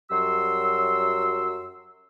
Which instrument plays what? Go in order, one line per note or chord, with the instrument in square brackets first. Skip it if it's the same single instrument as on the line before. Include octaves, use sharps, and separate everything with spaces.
[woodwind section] F#2 F#3 G3 C6 E6